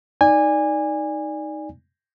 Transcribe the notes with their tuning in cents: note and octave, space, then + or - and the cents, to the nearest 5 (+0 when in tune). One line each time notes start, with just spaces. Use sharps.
D#4 +0 D5 +0 G#5 -20